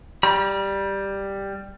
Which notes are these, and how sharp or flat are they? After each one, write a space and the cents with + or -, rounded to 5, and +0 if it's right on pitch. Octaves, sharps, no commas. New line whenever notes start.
G3 +5 B5 -40